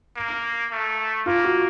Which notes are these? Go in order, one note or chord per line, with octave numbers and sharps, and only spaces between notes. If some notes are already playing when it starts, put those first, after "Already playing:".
A#3
A3
A#3 F4
F#4